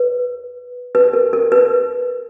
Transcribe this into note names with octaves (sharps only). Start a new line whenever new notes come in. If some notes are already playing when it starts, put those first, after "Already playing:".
Already playing: B4
B4
A#4
A#4
B4